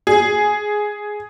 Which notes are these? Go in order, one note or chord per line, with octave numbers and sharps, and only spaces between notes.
G#4